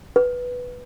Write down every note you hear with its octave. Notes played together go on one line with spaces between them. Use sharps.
B4